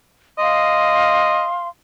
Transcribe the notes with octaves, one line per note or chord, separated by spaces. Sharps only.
D#5 F5 C6